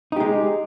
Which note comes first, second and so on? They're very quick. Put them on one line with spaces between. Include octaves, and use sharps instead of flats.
D#4 G4 G#3